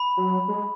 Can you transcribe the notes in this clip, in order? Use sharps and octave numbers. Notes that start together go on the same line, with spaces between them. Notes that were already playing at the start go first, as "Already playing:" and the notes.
Already playing: B5
F#3
G#3